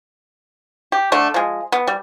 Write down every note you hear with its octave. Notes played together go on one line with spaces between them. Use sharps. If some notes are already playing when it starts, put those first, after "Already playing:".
G4
D3 A3
F3 G#3
B3
G3